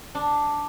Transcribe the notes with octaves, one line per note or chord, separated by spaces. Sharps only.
D4